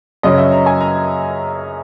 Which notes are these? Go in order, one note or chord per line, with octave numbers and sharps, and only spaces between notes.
F#2 C#3 F#3 C#4 D#5
E5
A#5
G#5
A#5